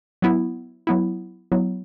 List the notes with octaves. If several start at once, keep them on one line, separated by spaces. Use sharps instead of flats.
F#3 B3 E4
F#3 B3 E4
F#3 B3 E4